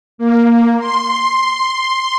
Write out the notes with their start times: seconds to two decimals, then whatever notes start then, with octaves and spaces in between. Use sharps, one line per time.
0.18 A#3
0.79 C6